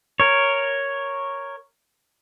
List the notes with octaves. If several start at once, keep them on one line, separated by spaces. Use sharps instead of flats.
A#4 C#5